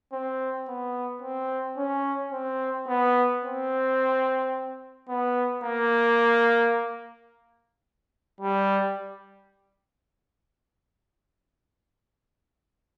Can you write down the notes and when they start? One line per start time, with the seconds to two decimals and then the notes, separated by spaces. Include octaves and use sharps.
0.13 C4
0.68 B3
1.22 C4
1.77 C#4
2.32 C4
2.88 B3
3.44 C4
5.09 B3
5.64 A#3
8.41 G3